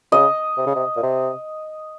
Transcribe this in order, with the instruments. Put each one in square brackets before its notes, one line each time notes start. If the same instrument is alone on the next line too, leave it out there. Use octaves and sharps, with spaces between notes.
[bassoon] C#3 [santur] D#5
[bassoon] C3
C#3
C3
A#2
C3